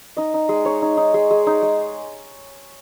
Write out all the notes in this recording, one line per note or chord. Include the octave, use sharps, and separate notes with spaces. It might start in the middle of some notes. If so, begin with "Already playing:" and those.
D#4 D#5
D#4
G#3
D#4 C#5
D#4
D#4
G#3
G#3
D#4
G#3